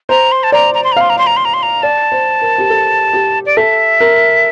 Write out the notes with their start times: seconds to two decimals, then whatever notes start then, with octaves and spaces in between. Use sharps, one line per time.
0.09 C5 A#5
0.32 C6
0.43 A5
0.52 D5 A#5
0.75 A#5
0.84 C6
0.92 A#5
0.97 F5 C6
1.10 A#5
1.18 C6
1.27 A#5
1.37 C6
1.45 A#5
1.54 C6
1.63 A#5
1.83 D5 A5
2.12 C5
2.42 A#4
2.58 G4
2.70 A4
3.13 G4
3.46 D5
3.57 A4 E5
4.01 A#4